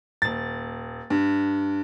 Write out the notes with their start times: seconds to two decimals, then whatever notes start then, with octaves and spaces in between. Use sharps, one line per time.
0.22 D#1 A6
1.10 G2